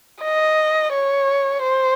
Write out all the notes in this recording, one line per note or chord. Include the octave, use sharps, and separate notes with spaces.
D#5
C#5
C5